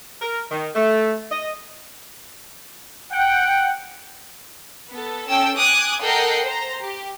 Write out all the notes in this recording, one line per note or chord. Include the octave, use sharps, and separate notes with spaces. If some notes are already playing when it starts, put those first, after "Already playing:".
A#4
D#3
A3
D#5
F#5 G5
B3 A4
C#4 A4 G5 E6
G#5 D6 D#6 F#6 G#6
A4 A#4 D#5 F#5 G5 C7
C5 A#5
G4